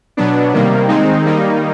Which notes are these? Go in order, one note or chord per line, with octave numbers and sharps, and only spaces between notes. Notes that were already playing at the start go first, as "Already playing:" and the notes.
B2 F#3 B3 D4
C3 D#3 G3 A#3
D#3 G#3 C4 D#4
D#3 G3 A#3 D#4